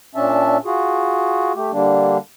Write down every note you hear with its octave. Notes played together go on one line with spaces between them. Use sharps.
A#2 C#4 D4 E5 A5
F4 F#4 G#4
A3 G4
D3 G3 A#3 D4